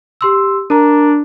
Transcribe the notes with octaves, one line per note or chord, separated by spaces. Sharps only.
G4 C6 E6
D4 A#4 A#5